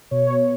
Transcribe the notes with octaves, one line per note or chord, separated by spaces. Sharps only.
B2 C#5